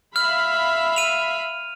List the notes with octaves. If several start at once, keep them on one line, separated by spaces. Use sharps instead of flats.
E5 F5 B5 F6
D#7 F7